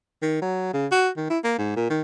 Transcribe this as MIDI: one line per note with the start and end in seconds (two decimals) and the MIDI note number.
0.22 0.41 51
0.42 0.70 54
0.74 0.87 49
0.92 1.09 66
1.17 1.26 51
1.30 1.39 64
1.44 1.53 58
1.58 1.72 44
1.77 1.90 46
1.90 2.02 51